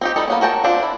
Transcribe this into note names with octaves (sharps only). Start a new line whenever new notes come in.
C4 D#4 G4
G3 D#4 A4
A#3 B3 C#4
F#4 A#4 G5 A5
C4 D4 F4
E4